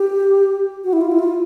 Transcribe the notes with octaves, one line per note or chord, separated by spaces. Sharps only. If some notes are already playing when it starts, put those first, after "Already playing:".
Already playing: G4
F#4
E4
F4
E4
F4